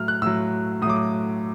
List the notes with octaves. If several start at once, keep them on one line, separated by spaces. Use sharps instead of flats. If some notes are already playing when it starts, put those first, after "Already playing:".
Already playing: A2 F#3 F6
F#6
A2 F#3 E6
A2 F#3 D6 D#6
D#6